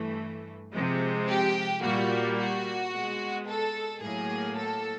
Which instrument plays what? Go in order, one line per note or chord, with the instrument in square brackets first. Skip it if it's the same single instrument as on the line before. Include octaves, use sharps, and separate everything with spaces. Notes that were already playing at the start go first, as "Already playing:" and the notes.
Already playing: [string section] G2 E3 A3
C3 F3 G#3
G4
A#2 G3 A#3 F#4
F#4
B2 G#3
A4
A2 F#3 A#3 G#4
A4